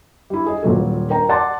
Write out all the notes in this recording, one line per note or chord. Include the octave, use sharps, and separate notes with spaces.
G3 E4
G#4 D#5
D#1 A#2 F#3 A4
A#4 G5 A#5
D5 F#5 A5 C6 D6 A6